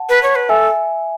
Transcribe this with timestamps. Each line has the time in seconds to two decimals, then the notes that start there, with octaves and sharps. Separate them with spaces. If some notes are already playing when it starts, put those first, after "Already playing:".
Already playing: F#5 A5
0.09 B4
0.23 C#5
0.35 B4
0.49 A4 E5 G#5